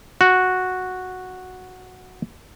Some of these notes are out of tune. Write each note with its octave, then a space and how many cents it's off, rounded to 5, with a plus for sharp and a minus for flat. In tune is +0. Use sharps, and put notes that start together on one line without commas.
F#4 -5